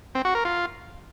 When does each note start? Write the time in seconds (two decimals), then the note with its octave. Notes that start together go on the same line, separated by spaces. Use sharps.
0.15 C4
0.25 F#4
0.35 A#4
0.45 F4